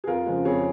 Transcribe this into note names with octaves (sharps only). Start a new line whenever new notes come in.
G#4
F2 F4 A#4
C#3 F3 G#3
F2 G#4 C#5